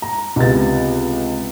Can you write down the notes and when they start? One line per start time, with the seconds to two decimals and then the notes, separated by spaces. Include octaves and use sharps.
0.02 A#5
0.36 C#2 C3 B3 A6